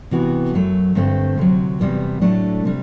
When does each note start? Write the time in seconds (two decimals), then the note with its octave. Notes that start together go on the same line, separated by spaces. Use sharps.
0.11 C3 E3 B3 F#4
0.54 F#2 F#3 A3
0.95 G2 D3 A3 C4
1.38 D2 C3 F#3
1.79 E2 C3 G3 B3
2.21 A2 F#3 A3 D4 A4
2.65 C3 G3